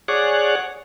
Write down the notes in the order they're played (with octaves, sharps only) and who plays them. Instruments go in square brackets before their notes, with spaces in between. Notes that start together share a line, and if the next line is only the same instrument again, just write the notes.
[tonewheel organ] G#4 C#5 D5 F#5